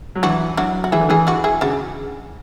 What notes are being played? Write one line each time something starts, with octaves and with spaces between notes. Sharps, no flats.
F#3
E3 D4 F#4
F#3 D4 F#4
F#4
E3 E4 G#4
D3
E3 E4 G#4
D4 F#4
E4 G#4
C#3 D4 F#4